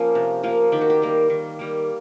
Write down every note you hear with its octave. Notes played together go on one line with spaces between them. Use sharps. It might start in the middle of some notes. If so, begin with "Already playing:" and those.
Already playing: F3 A#3 C#4
C3
F3 A#3
D#3 G4
F#4
G4
G3 A#3
D#3
G3 A#3